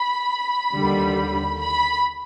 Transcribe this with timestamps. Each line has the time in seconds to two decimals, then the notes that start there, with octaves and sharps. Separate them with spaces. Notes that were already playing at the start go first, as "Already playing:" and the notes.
Already playing: B5
0.75 D#2 D3 G3
1.60 B5